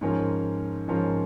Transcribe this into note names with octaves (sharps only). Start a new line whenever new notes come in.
G#2 F3 C#4 A#4
G#2 F3 C#4 A#4